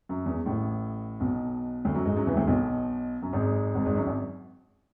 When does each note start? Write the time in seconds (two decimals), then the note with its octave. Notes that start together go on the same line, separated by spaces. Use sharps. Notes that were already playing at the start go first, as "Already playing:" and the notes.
0.09 F#2
0.26 E2
0.46 A1 A2
1.20 B1 B2
1.85 D2 D3
1.94 F#2 F#3
2.05 G#2 G#3
2.17 F#2 F#3
2.27 E2 E3
2.37 D2 D3
2.47 B1 B2
3.22 F#2
3.33 G#1 G#2
3.75 G#1 G#2
3.85 G#1 G#2
3.97 F#2
4.07 G#1